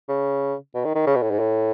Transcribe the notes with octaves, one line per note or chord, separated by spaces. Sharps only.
C#3
B2
D#3
D#3
C#3
B2
A2
G#2
A2